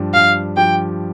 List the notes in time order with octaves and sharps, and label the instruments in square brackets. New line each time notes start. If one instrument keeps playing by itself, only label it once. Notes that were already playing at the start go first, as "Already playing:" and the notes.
Already playing: [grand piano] G2 F3 D4 G4
[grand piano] G2 [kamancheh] F5
[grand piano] F3 D4 G4 [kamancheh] G5